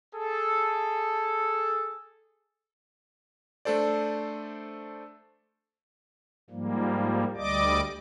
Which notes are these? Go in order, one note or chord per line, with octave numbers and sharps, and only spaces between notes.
G#4 A4
A3 D4 A4 C5 D5
G#2 F3 G3 A#3
D2 G3 D5 D#5 D6